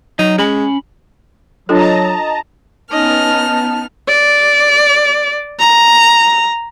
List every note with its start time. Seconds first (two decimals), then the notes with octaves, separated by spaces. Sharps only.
0.19 F#3 D#4
0.38 G#3 C#4 B5
1.69 F#3 D4 F4 A4 D#5 A5 A#5
2.91 B3 C#4 D#4 D#5 A5 F6
4.08 D5
5.60 A#5